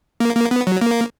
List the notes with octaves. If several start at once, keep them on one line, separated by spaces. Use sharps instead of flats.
A#3
A#3
B3
F#3
A#3